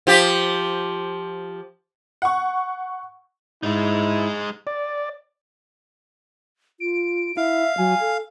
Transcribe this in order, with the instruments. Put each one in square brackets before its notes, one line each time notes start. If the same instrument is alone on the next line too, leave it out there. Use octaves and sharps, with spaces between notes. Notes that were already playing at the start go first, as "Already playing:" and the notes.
[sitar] F3 G4
[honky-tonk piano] F#5 C#6
[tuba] G#2 [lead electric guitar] G#3 D#4 [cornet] E4
[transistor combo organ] D5
[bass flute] F4 [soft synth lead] D7
[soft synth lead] E4 [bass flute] E5 [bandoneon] F5
[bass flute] F#3 [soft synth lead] G#5
[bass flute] A4